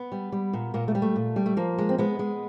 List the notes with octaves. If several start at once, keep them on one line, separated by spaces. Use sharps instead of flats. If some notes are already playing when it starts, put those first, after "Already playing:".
Already playing: B3
G3
G3
A#2
A#2 A#3
A3
G3
A3
A#2
G3
A3
F3 A#3
G#3
C4
G#3 B3
G#3